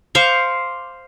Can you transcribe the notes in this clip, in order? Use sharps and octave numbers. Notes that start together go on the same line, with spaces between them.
C5 F5 C#6 D6